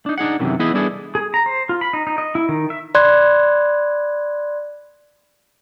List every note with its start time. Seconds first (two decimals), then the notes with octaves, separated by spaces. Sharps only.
0.06 D4 D#4
0.18 D4 D#4 G#4 F#5
0.39 F#2 C3 D#3 E3
0.59 E3 B3 E4 G#4 B4 D#5
0.74 G3 B3 D4 E4 G#4 A4
1.15 G#4
1.34 A#5
1.46 C5
1.69 F4
1.81 B5
1.93 D#4
2.07 D#4
2.18 D#5
2.35 E4
2.49 D#3
2.70 E5
2.95 D5 B5 C6 F#6 G#6